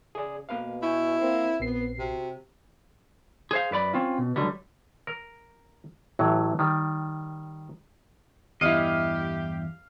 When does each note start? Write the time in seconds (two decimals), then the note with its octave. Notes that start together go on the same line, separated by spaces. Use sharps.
0.15 C#3 G#4 D5
0.49 B2 A#3 B4 F5
0.83 E4 G#5 C#6 G6
1.21 A#3 C4
1.60 A#1 B3 C7
1.98 C3 F#4
3.51 G#4 C5 F5
3.71 F#2 B4 D5 B5
3.93 C4 C#4 F4
4.18 B2
4.36 C#2 D3 F#3 G3
5.07 A#4
6.19 A1 A2 E3 F#3
6.59 D#3 G3
8.61 E2 G2 E4 G4 D#5 F5